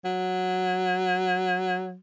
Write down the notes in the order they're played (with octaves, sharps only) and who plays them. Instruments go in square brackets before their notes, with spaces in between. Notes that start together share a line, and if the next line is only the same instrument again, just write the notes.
[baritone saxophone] F#3